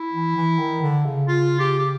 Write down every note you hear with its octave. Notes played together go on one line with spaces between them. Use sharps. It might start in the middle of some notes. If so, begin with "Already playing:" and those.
Already playing: E4
E3
E3
D#3
D3
C#3
F4
G4
G4